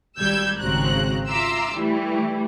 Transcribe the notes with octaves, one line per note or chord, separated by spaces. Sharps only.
G#1 G3 E6 G6 G#6
G#1 C#3 C4 F#4 A#5 F#6
F4 E5 A#5 C6 D6 E6
E3 G3 A3